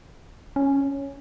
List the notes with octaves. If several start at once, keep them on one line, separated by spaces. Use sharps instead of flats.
C#4